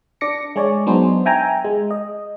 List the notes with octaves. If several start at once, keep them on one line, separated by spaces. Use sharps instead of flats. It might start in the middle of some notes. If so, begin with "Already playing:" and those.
D4 D6 A#6 C#7
G#3 G#4 C#5 D5
F#3 B3 D4 D#4 G#4 C5
E5 G5 G#5 A#5
G#3
D#5